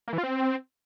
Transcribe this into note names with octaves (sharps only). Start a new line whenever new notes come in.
A#3
E3
F4
C4